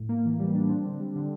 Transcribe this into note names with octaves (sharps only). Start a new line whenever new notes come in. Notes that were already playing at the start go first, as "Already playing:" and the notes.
Already playing: A2
A#3
E3
G3
D4
C4
D3
G3
D3